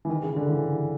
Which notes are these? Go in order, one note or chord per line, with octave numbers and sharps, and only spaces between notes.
E3
D#3
C#3
D3
E3